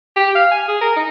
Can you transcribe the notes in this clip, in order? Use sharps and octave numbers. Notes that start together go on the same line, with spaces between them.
G4
F5
G#5
G#4
A#4
D#4